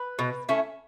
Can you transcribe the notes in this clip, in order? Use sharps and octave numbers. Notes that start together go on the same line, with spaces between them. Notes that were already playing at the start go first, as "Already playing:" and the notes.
Already playing: B4
B2
A3 C#4 E4